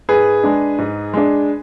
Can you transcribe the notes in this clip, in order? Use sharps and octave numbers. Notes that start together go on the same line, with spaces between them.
G#2 G#4 B4
G#3 D4
G#2
G#3 D4